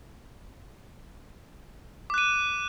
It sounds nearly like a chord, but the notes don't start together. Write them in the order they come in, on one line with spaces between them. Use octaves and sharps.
D6 F#6 D#7